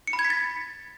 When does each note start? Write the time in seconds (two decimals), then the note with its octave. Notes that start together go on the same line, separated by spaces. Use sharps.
0.07 C#7
0.13 B5
0.19 G#6
0.25 B6
0.30 A6